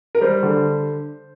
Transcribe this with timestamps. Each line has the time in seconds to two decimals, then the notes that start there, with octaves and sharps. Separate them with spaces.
0.15 A#4
0.21 G3 C5
0.43 D3